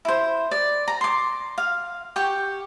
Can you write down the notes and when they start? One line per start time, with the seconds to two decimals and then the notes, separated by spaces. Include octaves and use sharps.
0.05 E4 C5
0.51 D5
0.88 A#5
1.01 C6 D6
1.58 F5
2.16 G4 G5 C#6